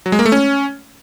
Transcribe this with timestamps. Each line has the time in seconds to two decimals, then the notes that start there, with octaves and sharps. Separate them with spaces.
0.06 F#3
0.12 G#3
0.19 A#3
0.26 A3
0.32 C#4